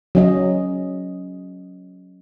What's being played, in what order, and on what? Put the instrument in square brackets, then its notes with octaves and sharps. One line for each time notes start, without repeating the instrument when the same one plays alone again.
[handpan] F#3 C#4 D#5